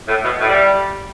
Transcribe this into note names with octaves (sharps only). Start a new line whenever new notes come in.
A2
B2
A2
G3